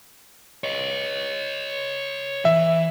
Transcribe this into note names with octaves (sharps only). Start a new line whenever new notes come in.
C#5 D#5
E3 E5